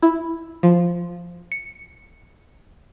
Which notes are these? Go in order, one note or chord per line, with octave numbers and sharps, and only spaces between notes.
E4
F3
C#7